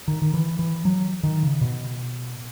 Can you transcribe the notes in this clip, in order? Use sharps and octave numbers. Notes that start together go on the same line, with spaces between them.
D#3
D#3
E3
E3
F#3
D#3
C#3
B2